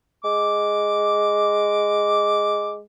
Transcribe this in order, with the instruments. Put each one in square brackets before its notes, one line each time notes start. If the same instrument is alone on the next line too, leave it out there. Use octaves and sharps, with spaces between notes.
[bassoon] G#3 [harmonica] D6